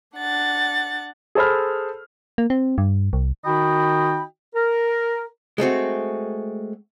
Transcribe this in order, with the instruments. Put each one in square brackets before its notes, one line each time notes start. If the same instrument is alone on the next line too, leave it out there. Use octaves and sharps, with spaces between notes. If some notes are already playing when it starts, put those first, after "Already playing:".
[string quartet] D4 F#5 A6
[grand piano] G#4 A4 C5 B5 F6
[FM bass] A#3
C4
G2
C2
[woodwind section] D#3 D#4 F#4 D#5 G5 B5
A#4
[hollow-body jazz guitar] G#3 A3 C4 F#4